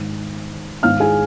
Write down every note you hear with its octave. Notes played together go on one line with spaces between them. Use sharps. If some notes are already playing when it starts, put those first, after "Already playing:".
Already playing: G#2 D#3
G#2 D#3 F5 F6
G#4 G#5